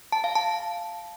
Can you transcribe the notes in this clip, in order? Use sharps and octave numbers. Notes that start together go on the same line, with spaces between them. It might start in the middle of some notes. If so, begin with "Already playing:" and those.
A5
F5
A5